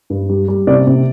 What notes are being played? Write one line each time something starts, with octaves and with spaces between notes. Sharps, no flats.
G2
G3
G3
C3 D5
C3